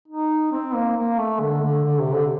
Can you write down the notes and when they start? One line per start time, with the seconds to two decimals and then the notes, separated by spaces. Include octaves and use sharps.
0.08 D#4
0.52 C4
0.74 A#3
0.97 A#3
1.18 A3
1.41 D3
1.62 D3
1.84 D3
1.99 C3
2.14 D3